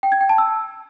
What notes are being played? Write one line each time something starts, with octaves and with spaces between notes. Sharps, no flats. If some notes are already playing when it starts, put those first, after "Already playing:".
G5
G#6
G5
A5
E6